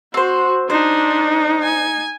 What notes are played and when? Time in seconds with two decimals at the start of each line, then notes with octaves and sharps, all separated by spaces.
0.14 C4 F#4 C5
0.70 D4 D#4 C5
1.62 G#5